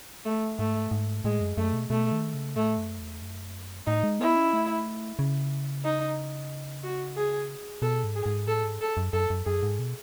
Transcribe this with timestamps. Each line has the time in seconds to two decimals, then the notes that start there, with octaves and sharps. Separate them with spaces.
0.25 A3
0.59 G#2 A3
0.91 G#2
1.24 A2 G#3
1.41 F#2
1.57 F#2 A3
1.73 B2
1.90 B2 A3
2.12 D#3
2.34 C#3
2.56 A2 A3
2.77 F#2
3.00 E2
3.22 F#2
3.87 A2 D#4
4.04 G#3
4.20 B3 E4
4.36 C#4
4.53 A3
5.19 C#3
5.84 D#4
6.83 F#4
7.16 G#4
7.82 B2 A4
8.04 G#2
8.15 G#4
8.26 G#2
8.47 A2 A4
8.64 G#2
8.81 A4
8.97 F#2
9.13 F#2 A4
9.30 F#2
9.46 F#2 G#4
9.63 G#2
9.79 B2